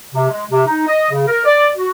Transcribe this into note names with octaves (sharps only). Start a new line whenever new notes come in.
C3
G#3
C3
D#4
D#5
C#3
A#4
D5
F#4